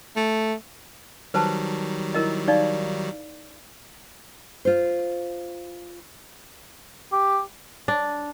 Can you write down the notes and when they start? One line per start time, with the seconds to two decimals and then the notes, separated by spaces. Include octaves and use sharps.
0.17 A3
1.34 D#3 F#3 G3 B4 C5 A5
2.14 E4 A#4 D#5
2.48 D#4 D5 F5
4.65 F4 C5
7.12 G4
7.88 D4